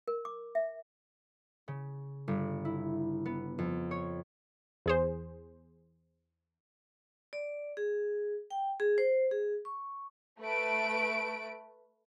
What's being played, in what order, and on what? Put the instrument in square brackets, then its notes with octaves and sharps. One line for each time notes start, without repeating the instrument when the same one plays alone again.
[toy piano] A#4
D6
E5
[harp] C#3
G1
E4
B3
F2
C#5
[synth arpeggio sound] E2 G#4 C5
[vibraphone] D5
G#4
G5
G#4
C5
G#4
C#6
[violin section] A3 B4 D7